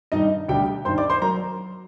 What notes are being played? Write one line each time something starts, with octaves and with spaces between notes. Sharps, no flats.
G2 D#3 G3 D#4 D#5
D2 D3 G3 G4 G5
G2 D#3 G3 C5 C6
D5 D6
C5 C6
F#3 A#4 A#5